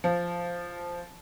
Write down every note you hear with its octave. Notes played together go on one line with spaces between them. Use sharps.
F3